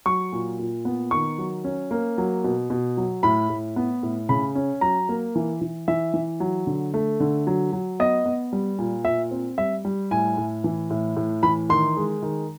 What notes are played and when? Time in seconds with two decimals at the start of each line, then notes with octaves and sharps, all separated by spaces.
0.06 F#3 C#6
0.32 A#2
0.59 A#2
0.85 B3
1.11 D#3 C#6
1.38 F#3
1.64 C#4
1.91 A#3
2.18 F#3
2.44 B2
2.70 B2
2.97 F#3
3.23 A2 B5
3.50 A2
3.76 B3
4.03 A2
4.29 C#3 B5
4.55 C#4
4.81 F#3 A#5
5.09 A#3
5.35 E3
5.61 E3
5.88 E3 E5
6.14 E3
6.40 F#3
6.67 D3
6.94 A3
7.20 D3
7.47 F#3
7.73 F#3
8.00 B3 D#5
8.25 B3
8.53 G3
8.79 A#2
9.05 A#2 E5
9.31 C4
9.58 G3 E5
9.85 G3
10.11 A2 G#5
10.37 A2
10.64 E3
10.90 A2
11.17 A2
11.43 E3 B5
11.69 D#3 C6
11.97 G#3
12.22 D#3